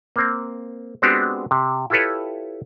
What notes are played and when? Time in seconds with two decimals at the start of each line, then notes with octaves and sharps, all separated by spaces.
0.16 A#3 C4
1.02 G#3 B3 C4 D4 F#4 G4
1.51 C3
1.90 E4 F4 G4 A4 B4 C#5